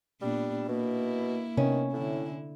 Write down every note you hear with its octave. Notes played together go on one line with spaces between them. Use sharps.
A#2 G3 B3 D4
B2 A#3 E4
C3 D#3 B3 C#4
A2 D3 E4